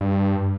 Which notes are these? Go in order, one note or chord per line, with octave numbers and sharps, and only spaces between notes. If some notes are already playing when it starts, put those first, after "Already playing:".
G2